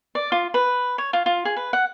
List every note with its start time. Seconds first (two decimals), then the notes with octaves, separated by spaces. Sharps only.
0.15 D5
0.32 F4
0.54 B4
0.98 C#5
1.13 F4
1.26 F4
1.45 G#4
1.56 B4
1.73 F#5